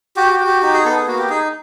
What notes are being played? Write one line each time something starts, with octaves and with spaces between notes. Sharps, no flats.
F#4 G4
G4
F#4
G4
D#4 G4
G#4
B3 A4
G#4
A#3 F#4
G4
D#4 G#4